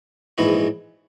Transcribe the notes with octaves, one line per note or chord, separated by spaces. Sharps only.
A#1 G#2 E3 B3 F#4